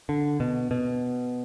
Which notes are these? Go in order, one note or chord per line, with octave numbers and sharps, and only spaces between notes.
D3
B2
B2